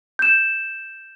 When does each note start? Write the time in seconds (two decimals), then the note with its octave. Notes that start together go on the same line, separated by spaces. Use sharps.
0.19 G6 E7